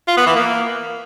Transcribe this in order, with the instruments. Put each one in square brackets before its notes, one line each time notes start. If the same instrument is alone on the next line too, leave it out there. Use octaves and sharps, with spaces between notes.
[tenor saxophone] F4
B3
E3
A#3